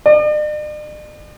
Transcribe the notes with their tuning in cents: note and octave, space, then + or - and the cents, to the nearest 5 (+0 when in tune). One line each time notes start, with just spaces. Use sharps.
D5 +45